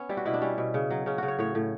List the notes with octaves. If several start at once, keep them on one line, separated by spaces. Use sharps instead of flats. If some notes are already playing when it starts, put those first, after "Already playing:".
Already playing: B3 C#4
G3 E4
F#4
B2 E4
D4
G3 C#4
B2
C#3
F#3
C#3 C#4
C#3 F#4
C#5
A2 C#5
A2